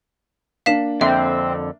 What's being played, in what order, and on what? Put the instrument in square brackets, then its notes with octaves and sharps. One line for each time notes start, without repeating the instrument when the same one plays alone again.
[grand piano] A#3 D4 [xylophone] F5 B6 E7
[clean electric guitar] F2 D3 [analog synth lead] C4 [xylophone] E5